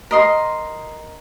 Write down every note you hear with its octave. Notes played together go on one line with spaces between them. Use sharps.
A#4 D#5 C6